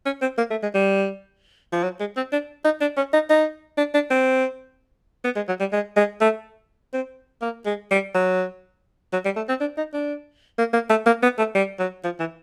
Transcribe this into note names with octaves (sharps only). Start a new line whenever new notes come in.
C#4
C4
A#3
A3
G#3
G3
F3
F#3
G#3
C4
D4
D#4
D4
C#4
D#4
D#4
D4
D4
C4
B3
G#3
F#3
G3
G#3
G#3
A3
C4
A#3
G#3
G3
F#3
F#3
G3
A3
C4
D4
D#4
D4
A#3
A#3
A3
A#3
B3
A3
G3
F#3
F3
E3